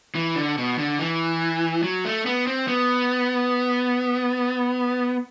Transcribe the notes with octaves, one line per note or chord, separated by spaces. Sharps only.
E3
D3
B2
D3
E3
F#3
A3
B3
C4
B3